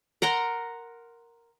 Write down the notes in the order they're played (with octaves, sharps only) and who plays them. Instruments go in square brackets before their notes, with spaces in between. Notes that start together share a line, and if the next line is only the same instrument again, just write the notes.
[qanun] A#4 F#5 A#5 C6